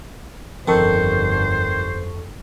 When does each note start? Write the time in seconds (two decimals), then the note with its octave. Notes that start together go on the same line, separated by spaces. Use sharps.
0.68 G1 F2 D#3 A4 C5 C#6